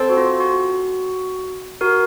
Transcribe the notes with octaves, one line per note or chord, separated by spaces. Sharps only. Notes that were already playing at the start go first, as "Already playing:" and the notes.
Already playing: C4 A4
F#4
F4
F#4
F#4 A#4